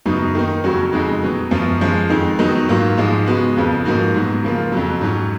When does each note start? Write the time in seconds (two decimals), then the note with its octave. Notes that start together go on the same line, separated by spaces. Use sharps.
0.06 F#2 C#3 F#3 B3 D#4
0.35 D#3 A#3 D#4
0.64 F2 C#3 F#3 C#4 F#4
0.93 F2 C#3 G#3 D#4 F#4
1.23 B2 F#3 B3
1.51 F#2 F3 B3
1.81 F3 G#3 C#4
2.09 F2 D#3 G#3 D#4
2.39 D#3 F#3 B3 D#4 F#4
2.69 G#2 F#3 A#3 F4
2.97 G#2 F3 G#3 D#4
3.27 C#3 G#3 B3 F#4
3.56 F2 C#3 F3 B3
3.85 G#2 F3 A#3 D#4 F#4
4.14 G#2 F#3 B3
4.44 C#3 F3 A#3 F4
4.72 F2 C#3 F#3
5.01 G#2 F#3 C#4